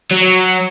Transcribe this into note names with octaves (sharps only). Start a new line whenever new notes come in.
F#3